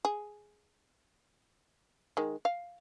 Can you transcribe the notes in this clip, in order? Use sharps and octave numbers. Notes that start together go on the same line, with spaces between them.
G#4
D#3 G#3
F5